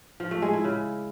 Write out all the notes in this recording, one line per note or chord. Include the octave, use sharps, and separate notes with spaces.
F3
A3
G#3
E4
C#3